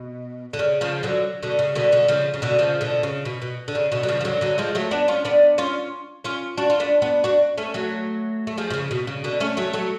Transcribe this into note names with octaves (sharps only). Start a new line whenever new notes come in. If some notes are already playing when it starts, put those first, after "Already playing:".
Already playing: B2
D3
C#3
C#3 F3
D3 F#3
B2 D3
C#3
B2 D3
B2 D3
C#3 F3
C#3
B2 D3
C#3 F3
B2 D3
C#3
B2
B2
D3
C#3
B2 D3
F#3
C#3 F3
F3
D3 F#3
D3 F#3
F3 G#3
F#3 A3
B3 D4
C#4 F4
B3 D4
C#4 F4
C#4 F4
D4 F#4
F4
B3 D4
B3 D4
D4 F#4
A3 C#4
F#3 A3
A3
F3 G#3
B2
C#3
B2
C#3
B2 D3
A3 C#4
F#3 A3
F#3 A3